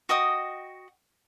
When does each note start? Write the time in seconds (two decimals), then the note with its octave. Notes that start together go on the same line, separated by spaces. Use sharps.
0.09 F#4 D#5 G5 D#6